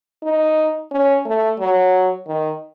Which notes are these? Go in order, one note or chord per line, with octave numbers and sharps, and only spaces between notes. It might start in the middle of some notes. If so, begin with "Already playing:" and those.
D#4
C#4
A3
F#3
D#3